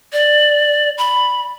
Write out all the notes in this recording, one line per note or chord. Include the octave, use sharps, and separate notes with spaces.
D5
B5